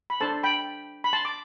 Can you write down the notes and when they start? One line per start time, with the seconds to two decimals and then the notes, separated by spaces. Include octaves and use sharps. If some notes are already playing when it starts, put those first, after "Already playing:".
0.10 B5
0.21 D4 A4 C5 A5 C6
0.43 G5 B5
1.04 B5
1.13 A5 C6
1.25 D6